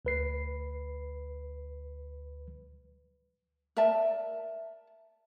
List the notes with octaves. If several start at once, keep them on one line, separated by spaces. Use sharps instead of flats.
D2 B4 C7
A#4 D5 E5 A5